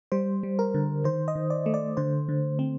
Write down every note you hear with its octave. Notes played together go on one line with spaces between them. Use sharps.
G3 C5
G3
A#4
D3
D#3 C5
D#5
D#3
D5
A3
D5
D3 C5
D3
C4